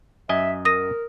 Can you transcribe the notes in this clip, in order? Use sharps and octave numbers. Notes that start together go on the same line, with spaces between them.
F#2 D#5 E5 G#5
A#4 D#6 A#6 D#7